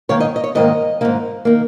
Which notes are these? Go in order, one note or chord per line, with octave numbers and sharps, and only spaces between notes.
G#2 D#3 A#3 C#5
D#5
D#5
C#5
G#2 D#3 A#3 D#5
G#2 D#3 A#3
D#3 A#3